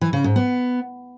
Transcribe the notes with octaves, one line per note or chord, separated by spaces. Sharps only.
E3
C#3
G#2
B3